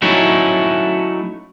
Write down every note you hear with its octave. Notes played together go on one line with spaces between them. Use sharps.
F#3 A3 C#4 D#4 E4